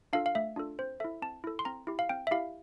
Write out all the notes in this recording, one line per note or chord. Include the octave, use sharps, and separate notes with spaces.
D4 F4 A4 F5
F5
A3 E5
D4 F4 A4
C4 C5
E4 A4 E5
C4 A5
E4 A4
C6
C4 A#5
E4 G4
F5
C4 G5
E5
E4 G4 F5